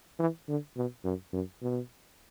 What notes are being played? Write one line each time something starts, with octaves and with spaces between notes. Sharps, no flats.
E3
D3
B2
F#2
F#2
B2